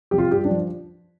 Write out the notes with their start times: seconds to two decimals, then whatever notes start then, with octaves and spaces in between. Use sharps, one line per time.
0.11 C3 F3 G4
0.18 F4
0.31 G2 G4
0.45 D4
0.50 F3